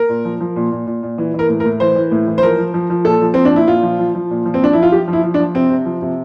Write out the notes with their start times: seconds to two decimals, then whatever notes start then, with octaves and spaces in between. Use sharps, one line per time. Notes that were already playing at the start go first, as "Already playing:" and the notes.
Already playing: A#4
0.09 A#2
0.25 F3
0.40 F3
0.56 A#2
0.71 A#2
0.87 A#2
1.03 A#2
1.18 E3
1.34 E3 A#4
1.49 A2
1.60 A#4
1.65 A2
1.80 E3 C5
1.96 E3
2.11 A2
2.28 E3
2.38 C5
2.43 F3 A#4
2.58 F3
2.74 F3
2.90 F3
3.05 A#2 A4
3.21 F3
3.34 F3 C4
3.45 D4
3.52 A#2 E4
3.68 A#2 F4
3.83 F3
3.99 F3
4.15 F3
4.30 A#2
4.46 F3
4.54 C4
4.62 F3 D4
4.73 F3 E4
4.83 F4
4.92 F3 G4
5.08 F3
5.13 E4
5.24 F3
5.34 D4
5.39 F3
5.55 C3 C4
5.70 C3
5.86 F3
6.02 C3